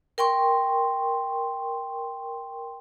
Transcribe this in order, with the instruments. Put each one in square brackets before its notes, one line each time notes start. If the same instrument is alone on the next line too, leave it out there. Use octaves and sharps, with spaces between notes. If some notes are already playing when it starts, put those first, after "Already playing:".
[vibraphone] A#4 G5 C6 C#6